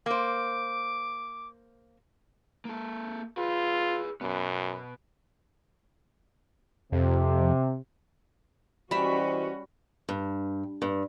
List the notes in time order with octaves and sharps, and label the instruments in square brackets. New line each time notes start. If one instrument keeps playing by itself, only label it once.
[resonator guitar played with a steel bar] A#3 C5 [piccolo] D6
[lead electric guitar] A#3 A4
[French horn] F4 [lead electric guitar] G#4 B4
[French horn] F#2 [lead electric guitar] B2 B3
[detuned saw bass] F2 [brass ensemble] C3
[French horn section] E3 C5 D#5 [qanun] G3 E5 [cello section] C#4 F#4 [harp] B5
[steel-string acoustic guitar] G2
G2